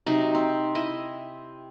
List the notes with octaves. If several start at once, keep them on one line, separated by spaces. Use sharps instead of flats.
C3 F#3 D#4
C4
E4 D#5